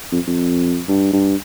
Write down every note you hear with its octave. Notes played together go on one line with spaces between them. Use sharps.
F2
F2
G2
G2